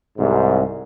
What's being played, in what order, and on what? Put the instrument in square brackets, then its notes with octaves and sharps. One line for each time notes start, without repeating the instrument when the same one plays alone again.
[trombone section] C2 G#2